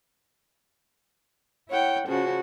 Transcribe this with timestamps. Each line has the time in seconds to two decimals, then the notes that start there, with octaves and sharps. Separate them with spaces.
1.69 E4 C#5 F#5 G5
2.08 C#3 F3 C#4 F#4